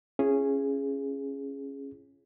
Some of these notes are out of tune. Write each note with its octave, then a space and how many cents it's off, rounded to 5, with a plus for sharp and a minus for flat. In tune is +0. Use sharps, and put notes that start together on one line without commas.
C#4 -10 E4 +45 G#4 +0